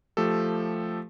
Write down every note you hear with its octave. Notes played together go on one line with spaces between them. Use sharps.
F3 A3 G4 A4